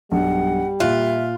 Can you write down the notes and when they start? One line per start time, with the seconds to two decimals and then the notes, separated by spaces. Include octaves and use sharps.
0.12 B1 G2 G3 F#5
0.80 A#2 F4 E5 F#6